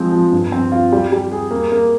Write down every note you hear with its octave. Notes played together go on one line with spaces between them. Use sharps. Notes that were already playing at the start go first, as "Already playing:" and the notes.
Already playing: F3 G#3 C4
F3
G2
C4
F4
G3
G3
G#4
A#3
A#3